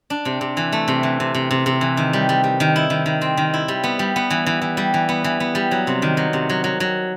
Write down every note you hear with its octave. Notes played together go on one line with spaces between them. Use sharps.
D4
C3
C3
E3
A3
C3
E3
C3
C3
C3
C3
E3
D#3
G3
G3
G3
D#3
E4
D#3
D#3
C4
D#3
E4
G3
B3
G3
B3
E3
E3
E3
G3
E3
B3
E3
B3
G3
F#3
C3
D#3
F#3
C3
F#3
F#3
F#3